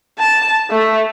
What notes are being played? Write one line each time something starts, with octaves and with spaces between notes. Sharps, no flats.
A5
A3